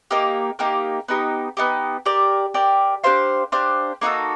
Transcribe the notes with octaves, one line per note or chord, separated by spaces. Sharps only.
A#3 D#4 G4 A#4
A#3 D#4 G4 A#4
B3 D#4 G4
B3 D#4 G4
G4 A#4 D5
G4 A#4 D5
D4 G4 C5 F5
D4 G4 C5 F5
A#3 D#4 F#4 A4